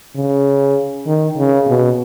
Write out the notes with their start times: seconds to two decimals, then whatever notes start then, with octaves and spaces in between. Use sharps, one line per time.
0.15 C#3
1.07 D#3
1.37 C#3
1.67 B2